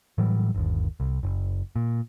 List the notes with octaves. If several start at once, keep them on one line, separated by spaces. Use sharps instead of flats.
A2 E3 F#3 G3
G1 D#2
C2
F#1
A#2